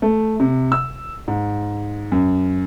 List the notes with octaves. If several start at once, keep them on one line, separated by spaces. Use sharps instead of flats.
A3
C3
E6
G#2
F#2